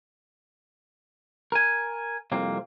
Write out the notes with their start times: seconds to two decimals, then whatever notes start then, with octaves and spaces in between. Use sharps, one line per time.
1.52 A#4 G#5
2.32 C2 F2 A#3 C4